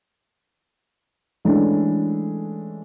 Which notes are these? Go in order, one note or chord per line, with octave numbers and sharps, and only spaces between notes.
E3 G#3 A3 C#4 D4